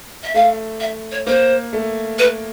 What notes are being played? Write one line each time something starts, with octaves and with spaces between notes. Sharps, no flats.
E5
A3 F5
E5
C#5
A#3 C5
A3
B4